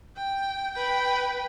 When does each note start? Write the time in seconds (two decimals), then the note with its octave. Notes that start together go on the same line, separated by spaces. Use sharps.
0.16 G5
0.73 B4 G5